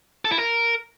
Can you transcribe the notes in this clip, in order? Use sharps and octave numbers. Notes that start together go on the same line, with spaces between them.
A4
E4
A#4